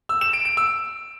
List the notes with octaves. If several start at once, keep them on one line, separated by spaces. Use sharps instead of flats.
E6
E7
D7
D7
E6